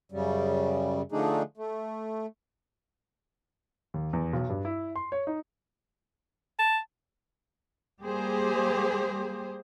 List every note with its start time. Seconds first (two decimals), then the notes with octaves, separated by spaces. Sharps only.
0.12 F#2 C#3 G3
1.12 D3 F3 A3 D4 D#4 G#4
1.57 A3
3.94 D#2
4.13 E2
4.33 B1
4.49 G2
4.65 E4
4.96 C6
5.12 C#5
5.27 D#4
6.59 A5
8.01 G3 A#3 G4 G#4 C5